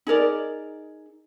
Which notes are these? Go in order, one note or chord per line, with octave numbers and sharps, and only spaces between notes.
D#4 G#4 A#4 D5